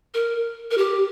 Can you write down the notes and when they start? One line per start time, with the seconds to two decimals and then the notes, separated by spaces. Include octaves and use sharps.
0.14 A#4
0.71 A#4
0.78 G4